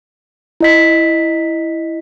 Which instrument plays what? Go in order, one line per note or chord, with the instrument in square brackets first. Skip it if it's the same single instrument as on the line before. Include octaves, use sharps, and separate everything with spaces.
[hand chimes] E4 D#5 B6